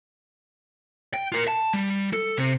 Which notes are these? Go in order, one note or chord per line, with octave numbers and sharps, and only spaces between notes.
G5
F4 A#4
A5
G3
A4
C3